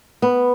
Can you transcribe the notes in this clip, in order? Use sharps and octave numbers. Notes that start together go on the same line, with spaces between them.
B3